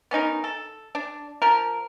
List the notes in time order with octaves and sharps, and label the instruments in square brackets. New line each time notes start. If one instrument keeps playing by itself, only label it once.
[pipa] B3 C#4 D#4 A#4
A4
D4
F3 A#4